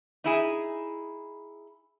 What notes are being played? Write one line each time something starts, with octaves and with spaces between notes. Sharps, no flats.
D#4 E4 G#4